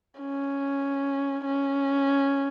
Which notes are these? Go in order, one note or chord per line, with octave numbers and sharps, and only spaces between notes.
C#4
C#4